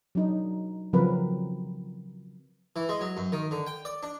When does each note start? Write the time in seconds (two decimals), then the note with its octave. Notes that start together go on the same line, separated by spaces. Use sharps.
0.15 F#3 D4 D#4
0.93 C#3 F3 F#3 C4 A#4 B4
2.76 E3
2.89 G#3
3.01 F#3
3.17 F#2
3.32 D#3
3.51 D3
3.67 G5
3.85 D5
4.03 D4